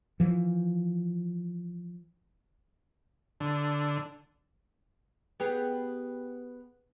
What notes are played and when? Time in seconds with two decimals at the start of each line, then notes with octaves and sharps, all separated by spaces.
0.20 E3 F3
3.40 D3
5.40 B3 G4 G#4